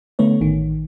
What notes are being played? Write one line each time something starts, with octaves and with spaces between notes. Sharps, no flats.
D3 A3 B3 C#5
A1 D#3